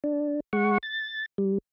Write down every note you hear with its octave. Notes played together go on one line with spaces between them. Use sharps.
D4
G#3 F#5 C#6
A6
G3